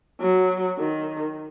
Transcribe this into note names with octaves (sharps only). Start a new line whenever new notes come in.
F#3
D#3